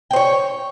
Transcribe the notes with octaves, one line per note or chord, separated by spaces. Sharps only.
C5 C#5 G5